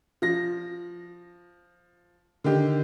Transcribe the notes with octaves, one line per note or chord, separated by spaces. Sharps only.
F3 A#6
D3 D#3 G4